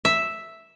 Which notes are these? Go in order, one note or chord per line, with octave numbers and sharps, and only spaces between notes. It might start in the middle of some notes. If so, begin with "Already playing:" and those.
E5